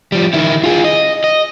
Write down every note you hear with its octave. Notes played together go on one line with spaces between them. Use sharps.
F3 G3
D#3 E4
F4 G#4
D#5
D#5